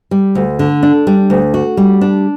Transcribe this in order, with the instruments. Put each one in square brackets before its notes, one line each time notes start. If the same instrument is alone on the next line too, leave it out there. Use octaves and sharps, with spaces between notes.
[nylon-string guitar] G3
D2
D3
D4
G3
D2
F#4
G3
D4